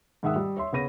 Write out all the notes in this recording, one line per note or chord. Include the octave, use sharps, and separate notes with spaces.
G#2 D#3 E5 F#5 D#6 E6
G3
C#5 E5 C6
C#3 B3 C#5 B5 A#6 D#7